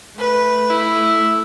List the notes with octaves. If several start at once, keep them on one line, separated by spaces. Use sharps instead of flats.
A3 B4
E4